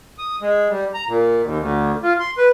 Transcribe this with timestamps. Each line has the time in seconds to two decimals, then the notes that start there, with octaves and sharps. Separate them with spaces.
0.18 D#6
0.41 G#3
0.70 G3
0.94 A#5
1.08 A#2
1.42 D#2
1.59 D2
2.03 F4
2.20 C6
2.38 B4